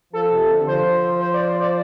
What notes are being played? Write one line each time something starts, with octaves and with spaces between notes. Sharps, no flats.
F3 A4
C3
D3
F3 C5
C5
D5
C5
D5